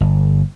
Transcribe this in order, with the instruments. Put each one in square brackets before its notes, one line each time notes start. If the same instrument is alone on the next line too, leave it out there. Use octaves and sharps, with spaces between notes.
[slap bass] G1